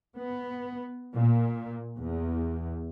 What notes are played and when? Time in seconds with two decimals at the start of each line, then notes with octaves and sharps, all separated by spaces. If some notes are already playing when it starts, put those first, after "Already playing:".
0.17 B3
1.14 A#2
1.99 E2